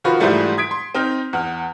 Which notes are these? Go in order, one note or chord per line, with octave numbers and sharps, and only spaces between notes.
D#3 F3 F4 F#4 B4
G#2 E3 F3 G3 A3
D#6 G#6 B6 D7
C6
C4 D#4 F6
E2 F#5 F6